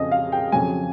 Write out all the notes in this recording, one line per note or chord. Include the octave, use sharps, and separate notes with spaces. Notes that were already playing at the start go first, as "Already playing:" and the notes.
Already playing: F2 C#3 F3 D#5
F5
G5
F2 C#3 F#3 G#5